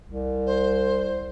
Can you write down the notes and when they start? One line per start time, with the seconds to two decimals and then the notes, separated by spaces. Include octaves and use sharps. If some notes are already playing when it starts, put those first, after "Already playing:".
0.08 C2
0.46 C5